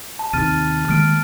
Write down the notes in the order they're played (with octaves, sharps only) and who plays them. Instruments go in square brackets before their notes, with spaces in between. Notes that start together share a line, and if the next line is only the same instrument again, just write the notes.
[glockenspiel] A5
[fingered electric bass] D#2 C3 D#3 [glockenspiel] F6 A6 D#7
[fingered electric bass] D#3 G#3 A#3 [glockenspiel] F6 D7